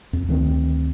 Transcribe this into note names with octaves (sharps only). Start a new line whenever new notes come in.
F2
D2 D#3 C4